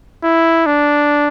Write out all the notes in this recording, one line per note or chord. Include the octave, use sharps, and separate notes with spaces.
E4
D4